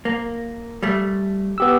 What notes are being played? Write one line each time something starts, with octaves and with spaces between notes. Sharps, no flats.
A#3
G3 A3
B3 G4 E6